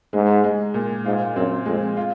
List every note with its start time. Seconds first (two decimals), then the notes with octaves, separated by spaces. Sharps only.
0.13 G#2 G#3
0.44 G#3
0.74 A#2
1.05 G#2 F4
1.36 F#2 C4
1.66 F2 G#3
1.97 F4